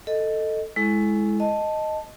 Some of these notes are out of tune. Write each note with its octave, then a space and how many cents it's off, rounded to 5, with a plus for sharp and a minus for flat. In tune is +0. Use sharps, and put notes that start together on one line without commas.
A4 +10 D#5 +0
G#3 +5 E4 +0 A4 -30
D#5 +0 A5 +0